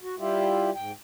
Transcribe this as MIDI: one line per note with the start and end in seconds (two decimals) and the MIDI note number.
0.01 0.15 66
0.19 0.71 55
0.19 0.71 64
0.19 0.71 65
0.19 0.71 67
0.75 0.92 44
0.75 0.92 79